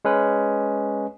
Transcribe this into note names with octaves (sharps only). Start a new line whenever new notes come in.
G#3 C#4 B4